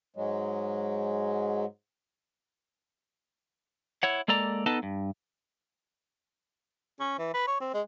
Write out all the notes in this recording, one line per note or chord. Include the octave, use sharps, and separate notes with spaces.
G#2 F#3 G#3
E4 C#5 F#5
G#3 A#3 A4 D5 A#5
B3 D#4 A4 B4 D#5 A5
G2
C#4
E3
B4
C#5
C4
G#3